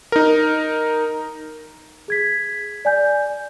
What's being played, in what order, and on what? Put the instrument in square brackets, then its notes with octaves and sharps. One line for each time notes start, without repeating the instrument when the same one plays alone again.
[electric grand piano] D#4 A#4
[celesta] G#4 G#6 B6
D5 G#5 G6